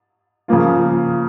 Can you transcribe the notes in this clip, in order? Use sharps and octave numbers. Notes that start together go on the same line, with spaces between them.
C#3 F3 A#3 F4